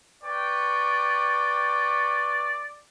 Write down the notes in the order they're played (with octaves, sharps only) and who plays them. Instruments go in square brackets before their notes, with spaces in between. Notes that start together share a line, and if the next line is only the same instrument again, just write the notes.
[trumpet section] B4 G5 C#6 [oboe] D5